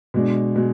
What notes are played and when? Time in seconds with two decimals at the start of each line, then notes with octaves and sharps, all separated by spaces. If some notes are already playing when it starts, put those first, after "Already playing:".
0.14 B2 G#3 D4
0.56 B2 G#3